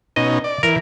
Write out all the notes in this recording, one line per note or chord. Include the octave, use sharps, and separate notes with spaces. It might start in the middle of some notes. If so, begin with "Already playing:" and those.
B2 C#4 D#4 D#5
D5
E3 A#4